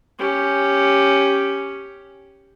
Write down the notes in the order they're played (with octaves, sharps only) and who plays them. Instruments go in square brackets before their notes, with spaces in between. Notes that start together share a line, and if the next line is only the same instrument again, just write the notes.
[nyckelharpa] C#4 G4